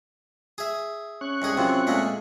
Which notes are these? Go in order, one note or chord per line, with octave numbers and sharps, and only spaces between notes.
G#4 E5
C#4 C#6 F#6
C2 G#2 G#4
F#2 C3 C4 F4
A#2 G#3 A3